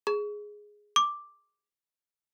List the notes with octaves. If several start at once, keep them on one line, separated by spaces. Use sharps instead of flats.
G#4
D6